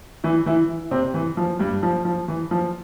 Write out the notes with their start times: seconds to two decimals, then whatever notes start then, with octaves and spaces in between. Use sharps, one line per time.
0.24 E3 E4
0.46 E3 E4
0.91 C3 C4
1.14 E3
1.37 F3
1.59 G2 G3
1.83 F3
2.05 F3
2.28 E3
2.51 F3